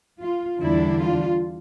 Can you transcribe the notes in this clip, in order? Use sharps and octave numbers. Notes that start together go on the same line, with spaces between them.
F4
E2 D3 G3 D4 E4
F4